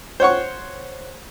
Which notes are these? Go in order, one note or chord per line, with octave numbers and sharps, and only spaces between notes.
C5 C#5 F#5 C#6